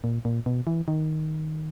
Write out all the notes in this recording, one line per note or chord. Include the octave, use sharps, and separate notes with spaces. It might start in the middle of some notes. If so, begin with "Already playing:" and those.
A#2
A#2
B2
E3
D#3